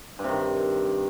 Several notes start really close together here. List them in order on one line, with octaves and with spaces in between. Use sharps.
G2 C3 D#3